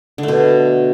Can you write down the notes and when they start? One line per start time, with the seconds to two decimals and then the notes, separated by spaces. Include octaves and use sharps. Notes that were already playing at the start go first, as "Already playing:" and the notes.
0.18 D3
0.23 A3
0.28 B2